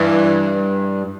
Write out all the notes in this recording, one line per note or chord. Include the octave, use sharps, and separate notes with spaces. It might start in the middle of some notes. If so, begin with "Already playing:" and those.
Already playing: G2 E3